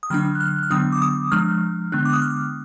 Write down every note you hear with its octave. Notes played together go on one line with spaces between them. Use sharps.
D#6
D3 F#3 A#3 D4 F6
F#6
F6
F6
D3 F#3 B3 D4 D#6
D6
D#6
F3 G#3 D4 F6
D3 G#3 B3 D4 F#6
D6
D#6
F6